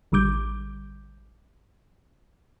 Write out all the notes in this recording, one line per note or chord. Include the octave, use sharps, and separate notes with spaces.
A1 D3 G3 D6 G6